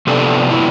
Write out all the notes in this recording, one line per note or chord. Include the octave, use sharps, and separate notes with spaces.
C3 F3 B3 D4 A4
E4